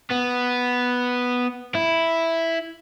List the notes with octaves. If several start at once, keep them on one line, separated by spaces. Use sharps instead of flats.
B3
E4